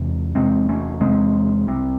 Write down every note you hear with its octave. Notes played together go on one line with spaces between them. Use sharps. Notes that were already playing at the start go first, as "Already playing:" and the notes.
Already playing: E2 C3 E3 G#3
E2 C3 G#3 C4
A3 C#4
E2 C3 G#3 C4
C2 C3